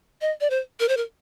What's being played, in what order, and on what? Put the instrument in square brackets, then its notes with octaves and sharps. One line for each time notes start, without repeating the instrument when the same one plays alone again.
[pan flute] D#5
D5
C5
A#4
C5
A#4